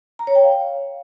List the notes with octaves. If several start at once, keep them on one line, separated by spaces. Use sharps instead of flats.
A#5
C#5
G5
F5